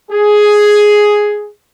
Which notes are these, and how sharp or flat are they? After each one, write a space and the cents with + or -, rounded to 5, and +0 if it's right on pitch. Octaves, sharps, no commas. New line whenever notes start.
G#4 +5